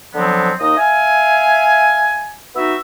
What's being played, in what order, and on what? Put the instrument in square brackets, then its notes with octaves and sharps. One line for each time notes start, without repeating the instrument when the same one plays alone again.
[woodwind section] D3 F3 F#3 B3 C4
D#2 D#4 D#5
E5 F5 G#5
B3 D#4 F#4 E5